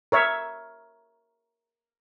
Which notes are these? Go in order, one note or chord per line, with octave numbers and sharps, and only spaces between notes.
A#4 C#5 E5